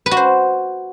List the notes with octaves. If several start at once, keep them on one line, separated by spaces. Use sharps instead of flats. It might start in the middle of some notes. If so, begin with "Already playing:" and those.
B4
F#4
C5